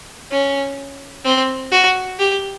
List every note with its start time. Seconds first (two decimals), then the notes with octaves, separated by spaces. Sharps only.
0.31 C#4
1.25 C4
1.72 F#4
2.19 G4